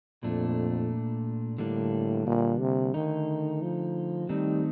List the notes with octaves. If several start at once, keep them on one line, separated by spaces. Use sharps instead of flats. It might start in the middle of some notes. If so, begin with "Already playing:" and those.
F2 A#2 A3 D4
A2 D3 G3 A#3 D4
A#2
C3
D3 D#3 A3 D#4
F3
D#3 G3 A3 C4 D#4